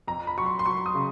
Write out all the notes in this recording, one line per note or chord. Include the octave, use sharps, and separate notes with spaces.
F2 A#5
B5
F#3 C#6
C6
C6
F#3 C#6
D#6
C#3